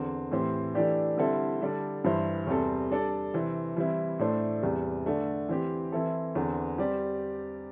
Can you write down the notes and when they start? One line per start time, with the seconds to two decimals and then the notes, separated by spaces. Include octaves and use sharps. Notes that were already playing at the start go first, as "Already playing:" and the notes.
Already playing: E2 D3 C4
0.31 A2 E3 C4 G4 C5
0.75 E3 A3 D4 G4 D5
1.18 D3 G3 C4 E4 A4
1.61 D3 G3 D4 A4 D5
2.04 G2 E3 G3 E4 C5
2.47 E2 C3 G3 C4 A4
2.91 G3 D4 A4 D5
3.34 C3 E3 C4
3.76 E3 G3 C4 E4
4.19 A2 A3 D4 C5
4.62 E2 C3 G3
5.06 D3 A3 D4
5.49 E3 C4 G4
5.92 E3 C4 E4 A4
6.35 E2 D3 C4
6.78 G3 C4 G4 D5